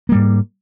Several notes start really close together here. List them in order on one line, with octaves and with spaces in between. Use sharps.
A#3 G3 G#2